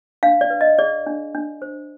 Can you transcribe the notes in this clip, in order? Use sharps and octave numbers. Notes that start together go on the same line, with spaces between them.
D4 F5
D5
B4
D#5
G#4 D5
D4
D4
C5